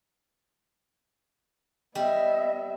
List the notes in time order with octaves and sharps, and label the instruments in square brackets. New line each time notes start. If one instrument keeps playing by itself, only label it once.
[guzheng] G3 [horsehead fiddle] B3 E5 [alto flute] D#5